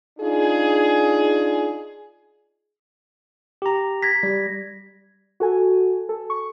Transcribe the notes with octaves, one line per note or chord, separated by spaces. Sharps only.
D4 D#4 F4 G#4
G4 A#5
G#6 A#6 B6
G3
F#4 A4 G#5
A4
C#6